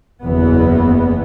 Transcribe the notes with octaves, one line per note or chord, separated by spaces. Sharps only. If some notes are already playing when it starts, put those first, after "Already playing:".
F#1 E2 E3 B3